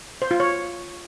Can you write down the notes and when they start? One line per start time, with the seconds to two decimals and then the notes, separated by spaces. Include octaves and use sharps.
0.22 C5
0.31 F4
0.40 C#5